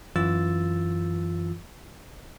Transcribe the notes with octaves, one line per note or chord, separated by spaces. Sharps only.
F#2 E3 F4 E6 A6